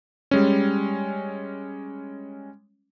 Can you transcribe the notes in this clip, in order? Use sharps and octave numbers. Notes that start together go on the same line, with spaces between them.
G3 G#3 C#4